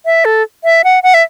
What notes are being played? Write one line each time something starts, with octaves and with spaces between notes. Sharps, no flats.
E5
A4
E5
F#5
F#5
E5